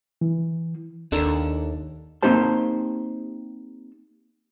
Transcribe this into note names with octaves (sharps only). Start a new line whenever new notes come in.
E3
D#2 D#3 D4 A4 A#4
A#3 C4 D#4 G4 C5 A5